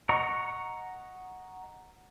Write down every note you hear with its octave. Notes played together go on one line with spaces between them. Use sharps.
D#5 F#5 A#5 C#6